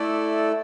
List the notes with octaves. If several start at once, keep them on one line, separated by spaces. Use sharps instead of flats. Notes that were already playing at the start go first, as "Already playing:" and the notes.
Already playing: A3 E4 A4 D5